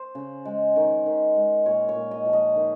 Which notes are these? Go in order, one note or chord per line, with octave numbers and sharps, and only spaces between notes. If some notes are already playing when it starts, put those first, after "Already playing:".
Already playing: C5
C#3
G#3
D#3
D#3
G#3
A#2 C#5
C#5
A#2
D#5
F3
D#5
D#3